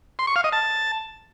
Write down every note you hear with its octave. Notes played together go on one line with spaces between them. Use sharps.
C6
C#6
F5
D#5
A5